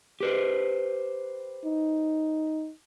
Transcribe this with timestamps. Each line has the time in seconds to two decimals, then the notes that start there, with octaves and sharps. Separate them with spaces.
0.20 G4 B4 C5
1.65 D#4